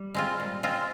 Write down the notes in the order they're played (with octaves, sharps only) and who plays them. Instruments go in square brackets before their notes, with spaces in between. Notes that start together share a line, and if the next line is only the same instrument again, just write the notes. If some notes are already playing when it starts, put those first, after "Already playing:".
Already playing: [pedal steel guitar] G3
[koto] G#3 C4 F4
A#2
G#3 C4 F4